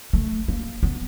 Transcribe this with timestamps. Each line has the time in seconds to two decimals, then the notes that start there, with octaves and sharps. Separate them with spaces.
0.13 A3
0.48 A#3
0.83 B3